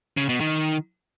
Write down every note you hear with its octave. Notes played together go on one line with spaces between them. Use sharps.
C#3
B2
D#3